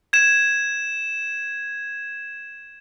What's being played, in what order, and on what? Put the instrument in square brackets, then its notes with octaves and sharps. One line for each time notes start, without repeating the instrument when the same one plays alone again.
[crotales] G#6 E7